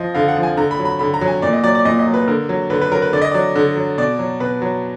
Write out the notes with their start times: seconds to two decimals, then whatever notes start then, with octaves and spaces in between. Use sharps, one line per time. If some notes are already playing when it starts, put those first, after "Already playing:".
Already playing: F3 D#5
0.15 D3 F5
0.28 F#5
0.36 F3
0.43 G#5
0.57 D3 A#5
0.71 B5
0.79 F#3
0.85 B5
0.99 D3 B5
1.14 A#5
1.21 F#3
1.28 G#5
1.42 A#2 D5
1.53 D#5
1.63 F#3 D5
1.75 D5
1.85 A#2 D#5
1.99 D#5
2.07 F#3
2.14 B4
2.27 D3 A#4
2.49 F#3
2.70 D3 B4
2.81 B4
2.91 F#3 A#4
3.02 B4
3.13 D3 D5
3.22 D#5
3.32 F#3 D5
3.56 D3
3.76 F#3
3.98 B2 D5
4.19 F#3
4.40 B2 B4
4.62 F#3